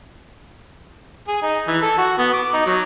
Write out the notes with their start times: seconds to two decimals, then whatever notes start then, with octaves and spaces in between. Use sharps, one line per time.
1.28 G#4
1.42 D#4
1.67 E3
1.82 A4
1.98 F#4
2.18 B3
2.33 D6
2.53 D#4
2.66 F#3